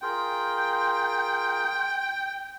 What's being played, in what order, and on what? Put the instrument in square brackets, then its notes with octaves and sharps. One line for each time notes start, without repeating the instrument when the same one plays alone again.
[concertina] F4 G#4 A#4 [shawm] G5